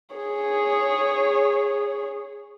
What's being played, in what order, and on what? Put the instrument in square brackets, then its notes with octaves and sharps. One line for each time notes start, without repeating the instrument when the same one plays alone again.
[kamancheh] G#4 C#5